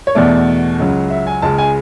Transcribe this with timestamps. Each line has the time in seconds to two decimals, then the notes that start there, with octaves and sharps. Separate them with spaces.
0.07 C#5
0.15 E2 B2 A3 D5
0.79 C#2 C#3 F#3
1.10 E5
1.27 G#5
1.42 C#2 C#3 G#3 A5
1.58 G#5